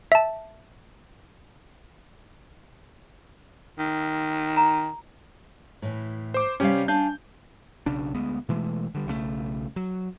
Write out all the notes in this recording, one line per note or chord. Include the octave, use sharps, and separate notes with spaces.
E5 A5
D#3
A#5
A2 E3
C5 D6
C3 G3 C#4 G4 F5
D4 F5 G#5 G6
B1 C#3 D4
D2 G#3 B3
B2 E3 G#3 A3
D3 G3
B1 C#3 E3 A3
F#3